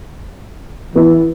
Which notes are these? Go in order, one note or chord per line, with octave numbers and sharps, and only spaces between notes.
E3 B3 E4